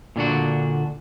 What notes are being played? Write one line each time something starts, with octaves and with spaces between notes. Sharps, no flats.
A#2 D3 D4 F#4